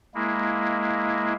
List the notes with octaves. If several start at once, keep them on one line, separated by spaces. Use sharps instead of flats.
G#3 A#3 E4